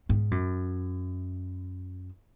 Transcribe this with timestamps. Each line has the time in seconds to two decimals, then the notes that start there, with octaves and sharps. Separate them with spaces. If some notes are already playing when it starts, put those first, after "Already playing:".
0.09 G#2
0.31 F#2